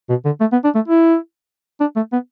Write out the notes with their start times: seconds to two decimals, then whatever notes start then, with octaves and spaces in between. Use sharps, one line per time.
0.10 B2
0.25 D3
0.40 A3
0.52 B3
0.64 D4
0.75 A3
0.88 E4
1.81 D4
1.96 A3
2.12 B3